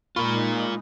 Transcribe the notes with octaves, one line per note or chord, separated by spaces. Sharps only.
A#2 G#3 A#3 D#4 F4 A#4 B5 C#6